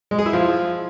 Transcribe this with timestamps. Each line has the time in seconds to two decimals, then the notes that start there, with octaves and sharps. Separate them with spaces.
0.11 G#3
0.19 G#4
0.26 E4
0.33 F3